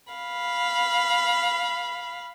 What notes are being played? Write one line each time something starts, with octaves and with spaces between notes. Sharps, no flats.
F5 B5